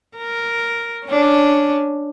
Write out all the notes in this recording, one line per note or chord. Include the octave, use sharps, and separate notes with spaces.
A#4
C#4 D4